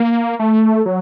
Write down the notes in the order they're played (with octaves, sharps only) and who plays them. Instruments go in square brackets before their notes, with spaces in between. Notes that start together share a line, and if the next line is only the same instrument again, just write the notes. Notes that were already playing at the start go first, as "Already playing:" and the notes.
Already playing: [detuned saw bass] A#3
A3
F#3